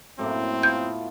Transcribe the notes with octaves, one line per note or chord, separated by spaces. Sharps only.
F#2 A2 A3 A#3 C4
B3 F4 G6